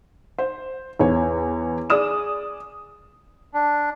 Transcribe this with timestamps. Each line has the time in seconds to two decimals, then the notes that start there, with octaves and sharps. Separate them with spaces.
0.39 C5
0.99 E2 C#5
1.90 G#4 D5 D#6 E7
3.54 D4